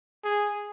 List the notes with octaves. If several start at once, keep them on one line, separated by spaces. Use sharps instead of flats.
G#4